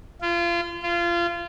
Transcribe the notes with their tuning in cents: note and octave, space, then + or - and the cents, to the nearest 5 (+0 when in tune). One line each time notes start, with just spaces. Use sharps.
F4 -30
F4 -25